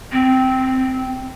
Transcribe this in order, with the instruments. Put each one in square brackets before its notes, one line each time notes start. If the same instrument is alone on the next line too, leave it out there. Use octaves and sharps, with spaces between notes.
[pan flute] C4